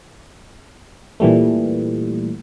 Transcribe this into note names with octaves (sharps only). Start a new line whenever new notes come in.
A#2 E3 G3 A3